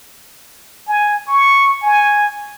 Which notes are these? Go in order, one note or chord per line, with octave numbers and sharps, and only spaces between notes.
G#5
C#6
G#5